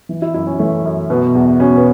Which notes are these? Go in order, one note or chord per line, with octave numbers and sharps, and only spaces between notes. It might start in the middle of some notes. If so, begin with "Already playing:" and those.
E3
E4
F#2 E4
C#4
E3 A3
F#2
B2 B3
E2
B2 C#4
B3